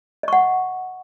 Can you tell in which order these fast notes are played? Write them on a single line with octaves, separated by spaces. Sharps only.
D#5 C#6 F#5